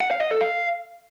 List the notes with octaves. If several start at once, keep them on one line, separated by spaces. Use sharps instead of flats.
F#5
F5
D#5
A4
F5